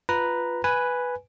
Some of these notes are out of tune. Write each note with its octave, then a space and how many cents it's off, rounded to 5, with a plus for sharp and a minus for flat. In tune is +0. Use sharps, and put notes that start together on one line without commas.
F4 +0 B4 +0 A#5 +0
B4 +0 G#5 +0